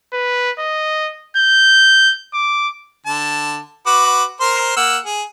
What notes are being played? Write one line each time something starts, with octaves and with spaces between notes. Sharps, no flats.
B4
D#5
G6
D6
D3 A5
F#4 B4 D6
A#4 C5 C6
A#3 F#5 E6
G#4